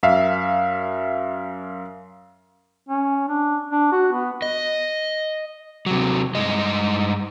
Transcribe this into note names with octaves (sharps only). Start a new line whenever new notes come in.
F#2 E5 F5
C#4
D4
D4
F#4
B3
D#5
C3 F#3
G2 G#3 D#5